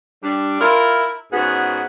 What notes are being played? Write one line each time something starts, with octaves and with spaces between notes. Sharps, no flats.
G3 D4
E4 F4 A#4
G#2 B3 C#4 F#4 G#4